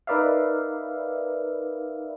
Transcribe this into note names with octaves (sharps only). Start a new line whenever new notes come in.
D#4 A#4 B4 D5 E5 F5